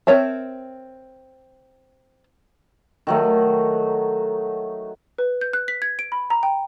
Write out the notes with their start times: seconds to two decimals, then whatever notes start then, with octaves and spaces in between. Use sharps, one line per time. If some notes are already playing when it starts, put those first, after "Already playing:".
0.07 C4 A#4 C#5 E5 A5
3.07 D#3 F#3 A3
5.18 B4
5.41 G6
5.53 F#6
5.68 B6
5.82 G#6
5.99 D7
6.12 B5
6.30 A#5
6.43 G5